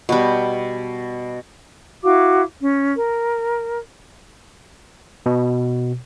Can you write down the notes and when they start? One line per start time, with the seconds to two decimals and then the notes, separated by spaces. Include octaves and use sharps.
0.09 B2 G3
2.04 E4 F#4 F5 D6
2.60 C#4
2.97 A#4
5.26 B2